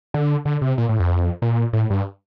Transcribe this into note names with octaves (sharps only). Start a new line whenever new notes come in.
D3
D3
C3
A#2
A2
F2
A#2
A2
G2